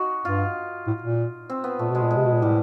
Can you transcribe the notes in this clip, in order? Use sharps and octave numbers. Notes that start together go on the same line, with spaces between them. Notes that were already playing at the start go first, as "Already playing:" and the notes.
Already playing: D#4 F#4
G2 F4
A2
A#2
C4
B3
A#2 A3
B2 G#3
A#2
G#3
C3
B2
A#2
A2 G3